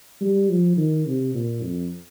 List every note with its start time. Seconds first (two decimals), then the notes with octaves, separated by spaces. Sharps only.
0.21 G3
0.49 F3
0.77 D#3
1.06 C3
1.34 A#2
1.63 F2